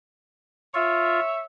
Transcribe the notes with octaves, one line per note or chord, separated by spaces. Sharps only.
F4 C#5 E5